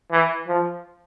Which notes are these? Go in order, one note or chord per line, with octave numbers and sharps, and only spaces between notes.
E3
F3